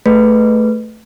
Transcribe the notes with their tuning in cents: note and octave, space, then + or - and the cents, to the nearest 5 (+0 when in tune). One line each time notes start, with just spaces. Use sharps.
A3 +0 G#4 +0 B4 +0